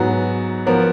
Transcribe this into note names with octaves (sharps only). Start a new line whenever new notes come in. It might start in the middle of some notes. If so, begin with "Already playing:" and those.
Already playing: G#2 F#3 B3 F#4
F3 B3 F#4 A#4